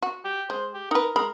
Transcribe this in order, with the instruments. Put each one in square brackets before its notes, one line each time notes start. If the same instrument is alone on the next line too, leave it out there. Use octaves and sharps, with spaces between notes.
[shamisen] F#4
[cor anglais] G4
[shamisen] G#3 [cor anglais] C5
[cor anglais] G4
[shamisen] D#4 B4 [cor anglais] A#4
[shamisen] G#3 B5 [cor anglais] A#4